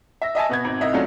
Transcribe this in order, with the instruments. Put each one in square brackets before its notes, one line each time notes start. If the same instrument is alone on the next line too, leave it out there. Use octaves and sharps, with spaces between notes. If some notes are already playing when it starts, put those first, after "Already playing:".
[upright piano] E5 A#6
D#5 E5 G#5 A5
B2 B3 G#6
G#1
C2 D#5 E5
F#3 A3 C#4 D4 F4 A4